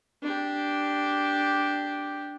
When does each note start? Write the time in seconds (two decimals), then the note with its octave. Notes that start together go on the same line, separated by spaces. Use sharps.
0.23 D4 G4